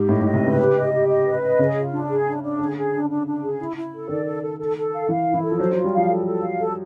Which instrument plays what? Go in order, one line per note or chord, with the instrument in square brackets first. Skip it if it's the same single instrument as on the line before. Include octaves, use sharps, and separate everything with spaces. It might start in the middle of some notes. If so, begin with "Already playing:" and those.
Already playing: [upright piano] G#2 [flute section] G4
[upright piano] A2 [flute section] D#5
[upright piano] A2 [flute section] D#5
[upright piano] C3
[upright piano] C#3 [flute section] B4
[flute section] G4
D#5
G4
D#5
B4
D#5
[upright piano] C#3 [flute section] G#4
[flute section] F4
D4
G#4
D4
D4
[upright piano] D3 [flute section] G#4
[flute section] G#4
D4
D4
D4
G#4
E4
E4
A4
[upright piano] D#3 [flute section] D5
[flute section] A4
A4
A4
A4
F5
[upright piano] E3 [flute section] F5
[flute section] E4
[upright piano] E3
[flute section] A4
[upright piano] F3
[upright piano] F#3 [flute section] C5
[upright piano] F#3 [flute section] F4
[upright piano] G3
[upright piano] F3 [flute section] F5
[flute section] A4
A4
F5
A4